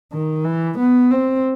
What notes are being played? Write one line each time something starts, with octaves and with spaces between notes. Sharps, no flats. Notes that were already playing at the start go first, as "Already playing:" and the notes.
D#3
E3
B3
C4